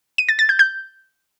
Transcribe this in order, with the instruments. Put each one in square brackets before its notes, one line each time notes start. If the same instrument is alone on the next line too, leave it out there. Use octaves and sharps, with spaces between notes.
[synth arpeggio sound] D#7
A6
A6
G6
G6